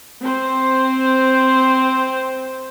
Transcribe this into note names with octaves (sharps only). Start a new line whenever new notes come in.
C4 C5